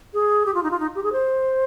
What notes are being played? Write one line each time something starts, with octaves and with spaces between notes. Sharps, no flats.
G#4
G4
F4
D#4
F4
D#4
G4
G#4
C5